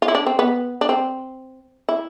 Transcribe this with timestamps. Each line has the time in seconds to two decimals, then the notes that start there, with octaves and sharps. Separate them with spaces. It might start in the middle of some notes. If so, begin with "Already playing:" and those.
0.02 F4
0.08 E4
0.15 D4
0.26 C4
0.39 B3
0.81 D4
0.89 C4
1.89 E4